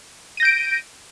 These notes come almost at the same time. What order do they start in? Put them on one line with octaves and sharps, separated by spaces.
D#7 A#6 G6 D7